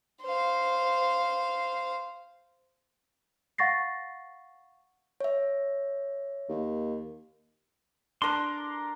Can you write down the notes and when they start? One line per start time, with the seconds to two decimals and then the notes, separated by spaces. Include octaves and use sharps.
0.25 C5 F5
3.58 F5 F#5 C#6 A6 A#6 C7
5.20 C#5 E5
6.49 D#2
8.22 D4 A#4 C6